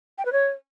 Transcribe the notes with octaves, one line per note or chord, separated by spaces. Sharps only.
G5
B4
C#5